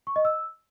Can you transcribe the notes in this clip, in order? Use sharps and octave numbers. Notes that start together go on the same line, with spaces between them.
C#6
D#5
E6